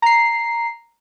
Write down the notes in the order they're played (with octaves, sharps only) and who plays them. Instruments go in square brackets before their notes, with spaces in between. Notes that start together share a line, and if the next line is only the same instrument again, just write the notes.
[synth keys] A#5 C7